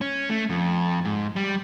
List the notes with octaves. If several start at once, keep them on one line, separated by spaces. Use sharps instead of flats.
C#4
A3
F2
G#2
G3